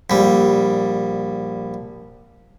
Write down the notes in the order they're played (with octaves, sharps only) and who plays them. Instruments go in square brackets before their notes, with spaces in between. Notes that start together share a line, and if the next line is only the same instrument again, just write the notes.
[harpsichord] A#1 G3